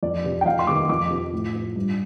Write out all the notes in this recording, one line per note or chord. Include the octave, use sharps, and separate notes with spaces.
F2 D5
C3 F3
G5
F2 F5
C6
C3 D#3 D6
F2 D6
C3 F3
A2
F3
G2